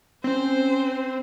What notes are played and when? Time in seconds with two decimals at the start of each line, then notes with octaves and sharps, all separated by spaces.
0.24 C4 C#4 C5